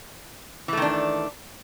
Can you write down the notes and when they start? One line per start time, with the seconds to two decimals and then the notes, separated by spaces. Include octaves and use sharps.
0.68 E3
0.73 A3
0.77 D#3
0.82 D4